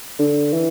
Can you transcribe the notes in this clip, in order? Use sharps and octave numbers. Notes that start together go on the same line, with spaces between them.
D3
E3